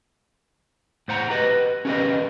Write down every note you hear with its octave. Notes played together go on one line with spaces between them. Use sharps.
A2 C5 F#5 A#5
G4 B4 D#5
C#4 G4 A#4 B4 D#5